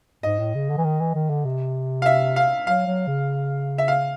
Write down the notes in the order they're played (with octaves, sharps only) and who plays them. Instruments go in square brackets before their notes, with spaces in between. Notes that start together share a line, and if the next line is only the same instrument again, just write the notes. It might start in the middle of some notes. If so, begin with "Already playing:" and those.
[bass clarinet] G#2 [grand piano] D#5
[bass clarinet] A2
C#3
D3
E3
D#3
E3
D#3
D3
C3
[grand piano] F5
E5
F5
[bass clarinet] F#3 [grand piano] F5
[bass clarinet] F#3
C#3
[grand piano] E5
F5